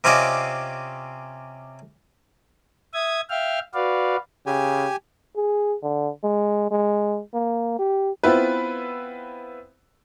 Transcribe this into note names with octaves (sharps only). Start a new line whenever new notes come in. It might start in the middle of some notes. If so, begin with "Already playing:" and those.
C3 C4 C#4 F4 D5 D#5
E5 D#6 G#6
E5 F5 G5 F6
F#4 B4 D5 F5
C#3 G4 G#5
G#4
D3
G#3
G#3
A#3
G4
B3 C4 E4 F4 B4